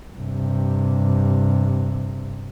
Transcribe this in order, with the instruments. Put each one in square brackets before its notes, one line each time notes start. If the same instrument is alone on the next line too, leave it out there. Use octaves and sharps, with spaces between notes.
[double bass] G2 C3